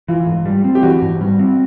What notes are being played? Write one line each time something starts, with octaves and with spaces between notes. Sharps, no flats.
E3 F4
G#2
G3
C4
G4
E3 F#4
G#2
G3
C4